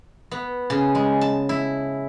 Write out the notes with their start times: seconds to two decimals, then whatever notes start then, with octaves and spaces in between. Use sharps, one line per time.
0.31 B3
0.70 C#3
0.95 G#3
1.21 A5
1.49 E4